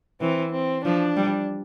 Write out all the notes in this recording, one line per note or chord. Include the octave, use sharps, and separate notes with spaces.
E3 C4
C4
F3 D4
G3